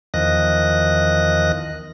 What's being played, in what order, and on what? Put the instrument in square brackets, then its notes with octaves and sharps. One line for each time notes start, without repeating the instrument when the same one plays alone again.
[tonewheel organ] E2 D#3 F3 D#5 F#6 A#6